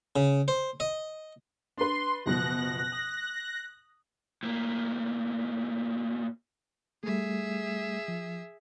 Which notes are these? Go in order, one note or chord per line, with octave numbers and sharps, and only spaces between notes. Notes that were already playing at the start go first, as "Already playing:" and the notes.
C#3
C5
D#5
D4 B4 C6
F#1 B2 F3 F#6 A#6
D#6
A2 A#3
G3 A3 G#4 E5
F3